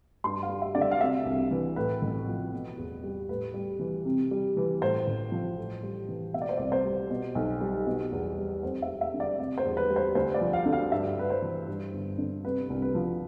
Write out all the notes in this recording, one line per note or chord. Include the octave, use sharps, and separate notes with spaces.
G2 C6
F5
G3
E5
D3 D5
E5
F5
C3 E5
C2
E3
A2 B4
A1
F3
B2
E2
G3
A2 B4
G3
E3
C3
G3
E3
A2 C5
A1
F3
A2
G3
E3
B2 E5
D5
C5
C2 D5
C5
G3
B2
B1
G3
B2
E2
G3
F2 C5
E5
G3
E5
D3
D5
C3 D5
C5
E2
B4
G3
C5
D2 C5
D5
F3
F5
D3
F5
G2 E5
G3 B4
C5
E3
G2
G1
D3
C3 B4
C2
B4
F3